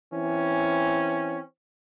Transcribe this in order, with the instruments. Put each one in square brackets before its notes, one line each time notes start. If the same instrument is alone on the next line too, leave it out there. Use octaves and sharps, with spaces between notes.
[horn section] E3 C4 C#4